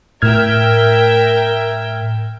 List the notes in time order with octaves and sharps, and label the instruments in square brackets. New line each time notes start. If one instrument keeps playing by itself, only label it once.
[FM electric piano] A2 F6 G#6 [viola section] A#4 E5 G5